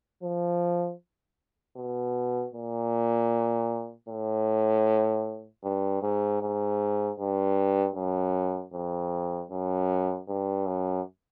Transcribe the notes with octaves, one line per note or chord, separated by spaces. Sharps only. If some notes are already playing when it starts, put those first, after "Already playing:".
F3
B2
A#2
A2
G2
G#2
G#2
G2
F#2
F2
F#2
G2
F#2